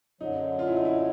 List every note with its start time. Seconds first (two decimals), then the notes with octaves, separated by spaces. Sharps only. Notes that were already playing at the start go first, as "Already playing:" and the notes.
0.21 F#2 D3 F#3 D#4
0.59 F4
0.67 E4
0.76 D#4
0.85 E4